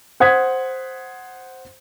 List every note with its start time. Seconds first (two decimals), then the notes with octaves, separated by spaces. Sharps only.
0.20 C5 F#5 D#6 G#6 B6